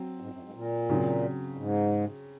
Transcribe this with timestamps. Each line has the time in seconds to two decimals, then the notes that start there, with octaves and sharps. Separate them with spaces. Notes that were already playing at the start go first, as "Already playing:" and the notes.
Already playing: F#3 C4
0.20 G#2
0.31 F#2
0.43 G#2
0.54 A#2
0.89 C#3 F#3 C4
1.57 G#2